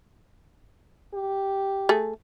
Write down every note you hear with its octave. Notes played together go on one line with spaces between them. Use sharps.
G4
A3 G#4